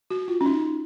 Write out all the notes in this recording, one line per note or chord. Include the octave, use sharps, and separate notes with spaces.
F#4
F4
C#4
D#4